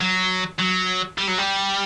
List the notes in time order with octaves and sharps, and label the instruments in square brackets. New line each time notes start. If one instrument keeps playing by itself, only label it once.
[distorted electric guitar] F#3
F#3
G3
F#3
G3